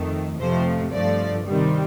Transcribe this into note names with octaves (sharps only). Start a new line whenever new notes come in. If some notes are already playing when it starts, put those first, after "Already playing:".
Already playing: F2 D#3 A3
F2 C3 F3 A3 C5
G2 F3 A3 D5
C3 D#3 G3